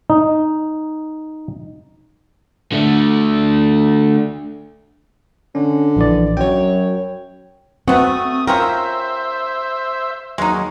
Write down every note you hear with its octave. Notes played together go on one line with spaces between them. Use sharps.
D#4
D3 A3
D3 C#4
A#1 E3 D5
F#2 F#3 C#5 G5
A3 B3 C4 F#4 D#6
C#4 F4 A#4 C5 E5 G5
D#2 F#3 G#3 D#4